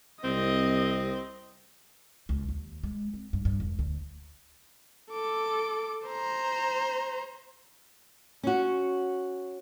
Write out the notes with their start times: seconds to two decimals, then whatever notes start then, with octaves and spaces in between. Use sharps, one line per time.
0.24 C2 C4 D#5
2.29 C#2
2.49 D#2
2.83 G#3
3.14 C4
3.33 G2
3.45 G2
3.60 E1
3.79 D2
5.11 A4 D6
6.07 C5 A#5
8.43 C#4 F#4